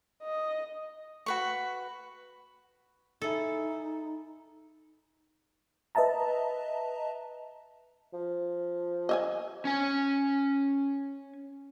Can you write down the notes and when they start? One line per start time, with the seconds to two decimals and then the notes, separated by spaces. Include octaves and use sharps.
0.23 D#5
1.26 F#4 B4 C#6
3.22 D#4 E4 G#4 A4
5.95 B4 D#5 E5 A5 A#5
8.13 F3
9.09 D#5 E5 G#5
9.65 C#4 G#5